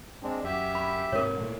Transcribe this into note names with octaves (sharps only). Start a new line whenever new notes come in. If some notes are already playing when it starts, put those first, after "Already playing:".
G#3 C4 D4
F#2 G4 E5
B5
G#2 C3 D#3 A#4 C#5
A#2 A3